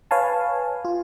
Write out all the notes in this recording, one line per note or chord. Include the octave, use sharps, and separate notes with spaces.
B4 C#5 F5 G#5 A5
F4